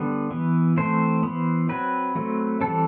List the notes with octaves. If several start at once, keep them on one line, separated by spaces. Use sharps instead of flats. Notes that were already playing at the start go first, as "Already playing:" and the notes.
Already playing: D3 G3 B3
E3 B3
E3 A3 C4 C5
E3 B3
F#3 C4 B4
F#3 A3 C4
E3 G3 C4 A4